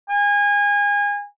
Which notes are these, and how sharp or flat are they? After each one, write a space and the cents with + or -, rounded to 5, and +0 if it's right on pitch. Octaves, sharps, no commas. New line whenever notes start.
G#5 -30